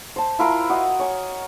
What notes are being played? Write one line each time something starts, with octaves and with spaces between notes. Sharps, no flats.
C5 A5
E4 F4 A#4
F#4 D#5
C#5 G#5